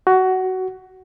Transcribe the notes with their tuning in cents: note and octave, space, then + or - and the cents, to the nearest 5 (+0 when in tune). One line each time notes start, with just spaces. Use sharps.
F#4 +15